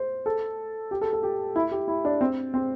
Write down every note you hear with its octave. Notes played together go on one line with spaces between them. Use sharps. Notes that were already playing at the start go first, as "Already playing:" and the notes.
Already playing: C5
A4
G4
A4
A4
G4
E4
G4
E4
D4
C4
C4